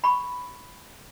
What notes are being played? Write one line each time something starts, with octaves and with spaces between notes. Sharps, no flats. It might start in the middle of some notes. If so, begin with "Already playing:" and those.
B5 C#6